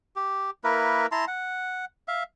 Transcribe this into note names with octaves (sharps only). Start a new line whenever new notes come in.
G4
A#3 E4 A#4 B4
E4 A5 A#5 C6
F#5
E5 F5